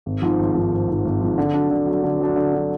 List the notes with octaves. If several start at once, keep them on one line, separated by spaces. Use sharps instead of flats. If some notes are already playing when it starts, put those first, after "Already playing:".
G#1
G#2 F3
G#1
G#2 F3
G#1
G#2 F3
G#1
G#2 F3
D3
F#3 D4
D3
F#3
D4
D3
F#3 D4
D3
F#3 D4